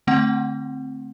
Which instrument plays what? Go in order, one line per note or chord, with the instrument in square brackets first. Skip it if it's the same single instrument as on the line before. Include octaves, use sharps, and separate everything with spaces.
[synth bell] D3 A3 C4 F#5